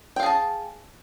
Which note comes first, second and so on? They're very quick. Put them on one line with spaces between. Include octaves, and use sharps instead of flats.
G5 F5 G#4 A5